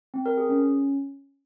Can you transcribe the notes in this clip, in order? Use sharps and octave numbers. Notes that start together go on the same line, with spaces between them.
C4
A#4
G#4
C#4